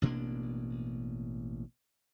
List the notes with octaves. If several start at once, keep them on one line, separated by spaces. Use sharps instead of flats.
A1 B2 A#3 D4